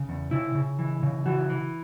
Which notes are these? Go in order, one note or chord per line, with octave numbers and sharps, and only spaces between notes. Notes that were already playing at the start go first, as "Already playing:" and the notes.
Already playing: C#3
E2
C#3 E4
C#3
E3
C#3
E3 F#4
E3